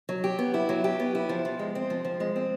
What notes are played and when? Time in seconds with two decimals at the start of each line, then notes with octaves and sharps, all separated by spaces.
0.09 F#3
0.24 G4
0.39 B3
0.54 E4
0.69 F#3
0.84 G4
1.00 B3
1.15 E4
1.29 F3
1.45 F3
1.59 G#3
1.75 C4
1.90 F3
2.05 F3
2.20 G#3
2.36 C4